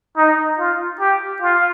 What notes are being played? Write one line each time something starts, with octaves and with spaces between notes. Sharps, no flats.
D#4
F4
G4
F4